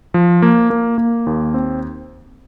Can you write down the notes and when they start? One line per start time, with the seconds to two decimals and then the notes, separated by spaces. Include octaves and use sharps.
0.14 F3
0.42 A#3
0.70 A#3
0.98 A#3
1.27 D#2
1.54 C4